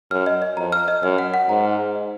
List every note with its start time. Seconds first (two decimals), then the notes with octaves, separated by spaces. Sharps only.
0.11 F#2 F6
0.26 D#5
0.42 D#5
0.57 F2 A#5
0.72 F6
0.88 D#5
1.03 F#2 F6
1.18 F#5
1.34 F#5
1.49 G#2 A#5
1.65 F6
1.80 F#5
1.95 D#5